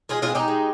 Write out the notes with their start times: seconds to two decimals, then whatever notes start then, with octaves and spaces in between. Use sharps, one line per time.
0.09 G#3 F4 G#4
0.22 F4 G#4
0.29 C4
0.35 D#4 G4
0.48 G#3